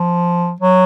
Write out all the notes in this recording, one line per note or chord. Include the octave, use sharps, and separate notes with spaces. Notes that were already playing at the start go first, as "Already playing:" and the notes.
Already playing: F3
F#3